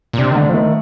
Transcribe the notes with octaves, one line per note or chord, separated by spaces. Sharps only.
A#2
C3 D4
D#3
A2 D3
F3
D#3 A3